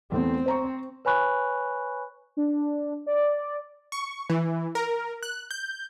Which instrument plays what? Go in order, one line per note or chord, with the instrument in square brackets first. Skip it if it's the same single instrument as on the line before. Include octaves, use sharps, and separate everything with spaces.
[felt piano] E2 A3 B3 [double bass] C4
[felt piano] C5 A#5 C#6
[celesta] B4 C#5 G#5 B5 C#6 F#6
[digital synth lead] D4
D5
[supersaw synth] C#6
E3
A#4
F#6
G6